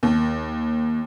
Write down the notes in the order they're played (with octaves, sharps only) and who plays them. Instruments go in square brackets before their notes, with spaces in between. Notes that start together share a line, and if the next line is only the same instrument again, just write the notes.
[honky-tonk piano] D#2